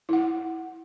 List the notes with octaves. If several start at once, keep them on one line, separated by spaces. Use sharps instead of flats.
E4 F#5